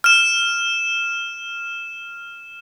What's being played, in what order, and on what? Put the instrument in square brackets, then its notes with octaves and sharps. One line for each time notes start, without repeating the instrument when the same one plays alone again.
[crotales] F6 E7